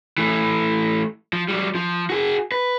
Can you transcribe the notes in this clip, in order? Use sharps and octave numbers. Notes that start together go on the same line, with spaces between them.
E3 A3
F3
F#3 G3
F3
F#4 G#4
B4